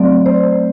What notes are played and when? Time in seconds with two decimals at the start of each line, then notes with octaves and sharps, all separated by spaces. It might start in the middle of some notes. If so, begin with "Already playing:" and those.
Already playing: F#3 A3 C4 D5
0.26 C5